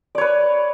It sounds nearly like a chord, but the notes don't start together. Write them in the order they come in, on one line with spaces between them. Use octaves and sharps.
D5 C#5 B4